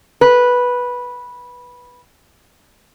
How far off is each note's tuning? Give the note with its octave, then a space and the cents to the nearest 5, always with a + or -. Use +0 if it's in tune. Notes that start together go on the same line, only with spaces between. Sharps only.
B4 -10